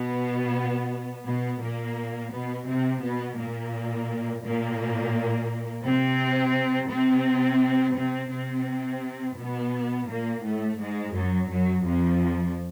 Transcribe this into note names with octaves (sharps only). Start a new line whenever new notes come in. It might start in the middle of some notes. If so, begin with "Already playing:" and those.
Already playing: B2 B3
B2 B3
A#2 A#3
B2 B3
C3 C4
B2 B3
A#2 A#3
A#2 A#3
C3 C4
C3 C4
C3 C4
C3 C4
B2 B3
A#2 A#3
A2 A3
G#2 G#3
F#2 F#3
F#2 F#3
F2 F3